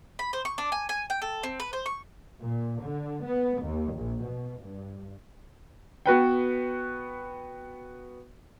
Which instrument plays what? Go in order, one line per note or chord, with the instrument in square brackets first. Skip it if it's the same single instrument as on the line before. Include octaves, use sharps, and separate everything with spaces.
[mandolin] B5
C5
C#6
D4
G#5
G#5
G5
A4
C4
B4
C5
C#6
[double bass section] A#2
D3
B3
D#2
A#1
B2
G2
[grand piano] B3 F#4 B4 G5